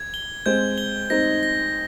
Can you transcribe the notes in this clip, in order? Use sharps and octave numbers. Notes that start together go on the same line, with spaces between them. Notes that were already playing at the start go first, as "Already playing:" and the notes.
Already playing: G#6
G7
G#3 C4 G6
G7
C4 D#4 A#6
A#6